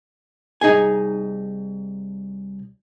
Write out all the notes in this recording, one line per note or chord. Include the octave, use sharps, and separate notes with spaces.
C2 D#4 G#4 G#5